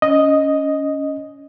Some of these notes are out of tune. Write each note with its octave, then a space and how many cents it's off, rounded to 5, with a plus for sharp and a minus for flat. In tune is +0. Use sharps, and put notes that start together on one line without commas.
C#4 +15 D#5 +0